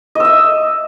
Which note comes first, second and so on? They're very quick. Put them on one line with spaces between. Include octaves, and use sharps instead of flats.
D#5 E6 E5